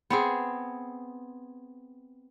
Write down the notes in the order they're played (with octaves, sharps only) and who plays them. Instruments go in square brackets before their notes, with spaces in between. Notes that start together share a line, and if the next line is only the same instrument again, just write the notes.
[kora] B3 C4 G#4